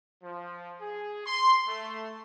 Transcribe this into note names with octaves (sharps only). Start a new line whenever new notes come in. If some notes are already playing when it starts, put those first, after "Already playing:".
F3
G#4
C6
A3